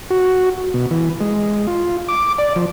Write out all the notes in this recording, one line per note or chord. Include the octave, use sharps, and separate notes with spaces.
F#4
B2
E3
G#3
F4
D6
D5
F3